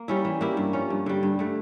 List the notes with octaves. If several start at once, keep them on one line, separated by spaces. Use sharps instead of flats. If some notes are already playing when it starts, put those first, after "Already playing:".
Already playing: A#3
G3 C#4 E4
E3
A#3 E4 G4
G2
F3 C#4
G2
D3 G3
G2
D3 A3